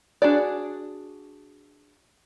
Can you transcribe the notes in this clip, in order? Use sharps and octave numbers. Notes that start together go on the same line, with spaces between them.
D4 F#4 G#4 D5